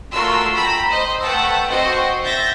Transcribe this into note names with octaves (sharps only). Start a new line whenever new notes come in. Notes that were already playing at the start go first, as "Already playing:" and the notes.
A3 F4 F#4 A#4 C6 E6
G5 A#5 B5 E6
C5 D#5
A3 B4 F#5 G5 A5 E6
C4 F#4 C5 D#5 G5
E5 G6 A6 A#6